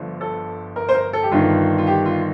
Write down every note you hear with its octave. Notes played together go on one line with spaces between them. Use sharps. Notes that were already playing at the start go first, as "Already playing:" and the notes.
Already playing: G1 G2 D3 F3
A4
A#4
C5
A#4
A4
G4
G1 G2 D#3 F4
F4
G4
F4